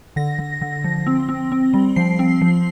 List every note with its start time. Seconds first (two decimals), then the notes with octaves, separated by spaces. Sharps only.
0.16 D3 A#6
0.39 D3
0.62 D3
0.84 F3
1.07 C4
1.29 C4
1.52 C4
1.74 G3
1.96 F3 C7
2.19 C4
2.41 F3